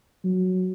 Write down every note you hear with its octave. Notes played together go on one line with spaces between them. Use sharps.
F#3